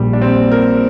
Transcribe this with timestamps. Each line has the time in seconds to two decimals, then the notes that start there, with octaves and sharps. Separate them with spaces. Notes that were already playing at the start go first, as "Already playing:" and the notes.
Already playing: A#1 A#2 G3 A#3 G4
0.13 D4
0.22 C4
0.52 A#4